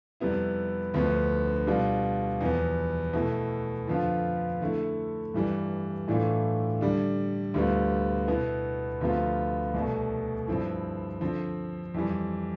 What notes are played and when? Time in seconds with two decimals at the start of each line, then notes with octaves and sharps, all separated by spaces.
0.20 F2 C3 G3 B3 E4
0.94 D2 D3 F3 B3
1.67 B2 G3 D4 F4
2.41 E2 C3 F3 B3
3.14 B2 A3 E4
3.87 F2 D3 F3 B3 F4
4.61 D3 A3 E4
5.34 G2 E3 G3
6.08 A2 E3 A3 D4 F4
6.81 D3 G3 D4
7.54 D2 C3 G3 B3 F4
8.28 B2 B3 E4
9.01 D2 C3 F3 B3 F4
9.74 C2 B2 A3
10.47 G2 F3 C4 E4
11.21 D3 F3 C4
11.94 F2 E3 G3